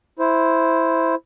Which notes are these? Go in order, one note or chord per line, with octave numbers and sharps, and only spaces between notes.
E4 C5